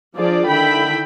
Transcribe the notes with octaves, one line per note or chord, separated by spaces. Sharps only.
F3 D4 F4 G#4 D5
D3 D#3 E4 G5 B5